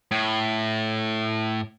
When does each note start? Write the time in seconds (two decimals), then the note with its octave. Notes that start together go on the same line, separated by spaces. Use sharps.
0.11 A2